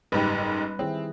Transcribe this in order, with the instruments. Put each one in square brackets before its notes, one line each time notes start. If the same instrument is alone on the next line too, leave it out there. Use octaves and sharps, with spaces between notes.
[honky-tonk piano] F#1 G#2 G4 [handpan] G3 B4
[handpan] D#3 E4 G#4 [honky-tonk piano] C4